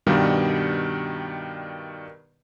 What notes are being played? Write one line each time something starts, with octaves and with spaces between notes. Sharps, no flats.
G2 B2 D#3 G3